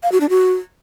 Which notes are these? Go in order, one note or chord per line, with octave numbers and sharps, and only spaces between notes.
F5
F#4
D4
F#4